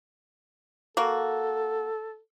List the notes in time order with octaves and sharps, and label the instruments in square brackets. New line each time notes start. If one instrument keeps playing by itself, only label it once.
[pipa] A#3 F#4 [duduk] A4